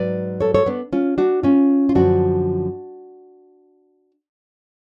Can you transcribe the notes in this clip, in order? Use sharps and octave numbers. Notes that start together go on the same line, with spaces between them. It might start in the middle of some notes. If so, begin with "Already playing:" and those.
Already playing: G#2 F#3 B4 D5
A4 C#5
A4 C#5
B3 D4
C#4 F4
D4 F#4
C#4 F4
F4
F#2 D3 F3 D4 F#4